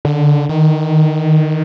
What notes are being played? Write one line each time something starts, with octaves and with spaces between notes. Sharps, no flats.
D3
D#3